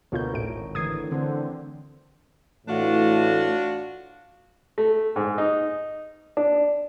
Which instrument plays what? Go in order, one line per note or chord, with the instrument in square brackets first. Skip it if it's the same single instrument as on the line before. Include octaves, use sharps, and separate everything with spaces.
[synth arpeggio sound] D2 F4 G6 [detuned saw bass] B2 [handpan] A#4 C#5
[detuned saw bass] G#1 [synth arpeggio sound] A2 D7
[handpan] D3 E3 A3 [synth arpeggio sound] D#6 G#6 C7
[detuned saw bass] D3 [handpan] C4 C5
[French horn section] A2 E3 A3 [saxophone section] D4 F4 F#4
[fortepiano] A3
G#2
D#4
D4